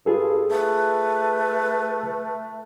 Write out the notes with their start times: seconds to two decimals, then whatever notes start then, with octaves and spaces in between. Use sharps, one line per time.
0.06 G2 F4 G#4 A4
0.51 A3 B4